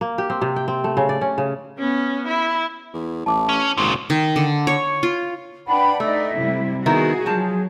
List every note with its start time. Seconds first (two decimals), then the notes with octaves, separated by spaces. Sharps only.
0.01 A#3
0.18 G4
0.30 C4
0.42 C3
0.56 G5
0.68 C4
0.84 A3
0.97 C#3
1.09 D5
1.21 C#4
1.38 C#3
1.78 B3 C#4
2.27 E4
2.94 E2
3.26 A1 A5 D6
3.49 C#4
3.77 G#1 A#2 C#3 C6
4.10 D#3
4.36 D3
4.67 C#5
5.03 F4
5.67 D4 B4 F#5 G5 B5
6.00 A3 D#4 D5 E5
6.36 C3 G3 E4
6.86 D#3 B3 E4 F#4 G#4
7.26 F3 F#3 G#4 A5